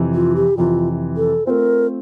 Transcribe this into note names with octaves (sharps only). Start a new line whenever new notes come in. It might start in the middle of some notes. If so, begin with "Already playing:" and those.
Already playing: F2 C3 E3
F4
G4
F2 C3 E3 F4
A4
A3 C4 F4 A#4 C5